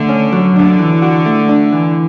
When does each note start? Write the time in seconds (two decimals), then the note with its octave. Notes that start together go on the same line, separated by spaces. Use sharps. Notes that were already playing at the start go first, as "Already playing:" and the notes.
Already playing: D3 A3
0.09 C#4
0.33 F#3
0.56 D3 D4
0.79 E3
1.02 F#4
1.26 A3
1.49 D4
1.72 E3